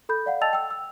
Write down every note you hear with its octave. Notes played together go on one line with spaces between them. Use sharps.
A4 B5 G6
D5 F5 F#5
D#5 G5 A5 E6 A6 F7
G5 E6
E6